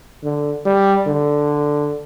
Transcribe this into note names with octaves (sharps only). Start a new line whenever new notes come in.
D3
G3
D3